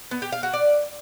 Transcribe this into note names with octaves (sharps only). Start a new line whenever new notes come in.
B3
G4
F5
F#4
D5